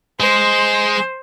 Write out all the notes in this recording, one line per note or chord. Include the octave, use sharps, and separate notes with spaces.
G#3 C5